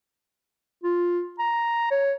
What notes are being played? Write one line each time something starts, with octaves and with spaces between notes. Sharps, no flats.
F4
A#5
C#5